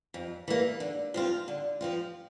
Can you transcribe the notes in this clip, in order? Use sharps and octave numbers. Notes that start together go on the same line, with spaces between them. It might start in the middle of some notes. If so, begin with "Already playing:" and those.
F2
E3 A#3
D3
F3 C4 F4
D3
F3 C4 F4